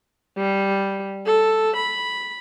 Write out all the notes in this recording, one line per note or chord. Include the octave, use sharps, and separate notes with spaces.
G3
A4
B5